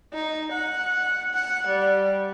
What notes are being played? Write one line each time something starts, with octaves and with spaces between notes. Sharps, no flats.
D#4
F#5
F#5
G3